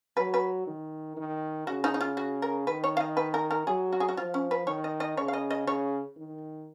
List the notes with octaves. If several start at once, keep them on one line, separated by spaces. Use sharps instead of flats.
F#3 B4
B4
D#3
D#3
C#3 F#4
D#4
D#4
F4
F#4
A#4
D#3 B4
C#5
F5
D#5
B4
A#4
A#4
F#3 G#4
F#4
G#4
F#4
F3 F4
C#4
B4
D#3 C#5
D#5
D#5
C#3 C#5
F5
D#5
D#5
C#3 C#5
D#3